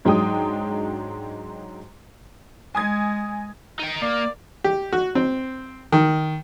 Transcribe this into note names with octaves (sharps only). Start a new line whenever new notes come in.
G#2 F#3 G#3 D4 G5 D#6
G#3 G#5 D#6 G#6
D#4 G5
A#3 D5
G4
F#4
C4
D#3